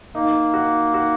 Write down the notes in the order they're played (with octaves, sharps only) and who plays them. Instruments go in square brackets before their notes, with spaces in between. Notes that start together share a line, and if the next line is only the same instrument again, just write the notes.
[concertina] A#3 [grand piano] D#4
[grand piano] F#4
F#4